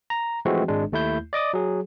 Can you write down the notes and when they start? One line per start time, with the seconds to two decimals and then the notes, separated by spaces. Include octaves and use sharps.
0.10 A#5
0.45 E3 F3 G#3 A3 C4 F#4
0.68 G#1 G#3 D4
0.92 D#2 A3 E4 G6
1.33 D5 D#5 D6 D#6
1.53 F#3 G#4